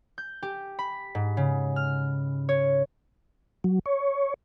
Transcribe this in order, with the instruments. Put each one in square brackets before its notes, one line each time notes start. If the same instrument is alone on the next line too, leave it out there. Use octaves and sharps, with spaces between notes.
[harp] G6
G4
B5
G#2
C#3
F6
C#5
[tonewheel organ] F#3
C#5